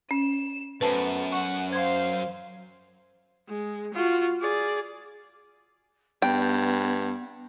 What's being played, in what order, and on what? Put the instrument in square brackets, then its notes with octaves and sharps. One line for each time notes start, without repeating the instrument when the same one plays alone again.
[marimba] C#4 [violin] E7
[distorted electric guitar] F#2 [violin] A3 B3 [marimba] B4 C5 A5
[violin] F#5 [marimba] C#6
[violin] C5 F5 [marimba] C6 G#6
[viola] G#3
F4 F#4
G#4 D5
[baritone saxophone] G2 [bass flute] B3 [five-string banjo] G5